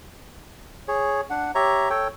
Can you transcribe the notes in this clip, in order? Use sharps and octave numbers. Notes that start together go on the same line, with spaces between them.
G#4 C#5
D4 F#5
G4 C#5 E5 A#5
A4 C#5 G5